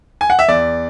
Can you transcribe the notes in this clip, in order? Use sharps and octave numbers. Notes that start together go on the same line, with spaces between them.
G#5
F#5
E5
E2 D5